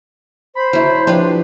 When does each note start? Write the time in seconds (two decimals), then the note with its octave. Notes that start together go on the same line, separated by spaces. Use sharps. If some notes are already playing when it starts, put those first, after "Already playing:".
0.55 C5 B5
0.73 F#3 E4
1.07 F3 D4 G4 B4